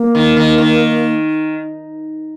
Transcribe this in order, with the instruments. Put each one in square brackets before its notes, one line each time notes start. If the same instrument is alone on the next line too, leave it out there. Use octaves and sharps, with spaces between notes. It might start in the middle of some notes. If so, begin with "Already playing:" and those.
Already playing: [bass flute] A#3
[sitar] D#3
D#3
D#3